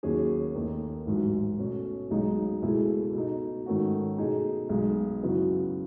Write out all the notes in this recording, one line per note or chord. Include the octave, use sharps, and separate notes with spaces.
D#2 D#3 F#3 C#4 G#4
D#2 D#3 A3
A1 G#2 F#3
B2 A3 C#4
B1 B2 G#3 D#4
C#2 B2 A3 E4 G#4
B2 A3 D#4
G#2 D#3 A3 C#4 F#4
B2 A3 D#4 G#4
B1 B2 G#3
F#2 C#3 F#3 B3 E4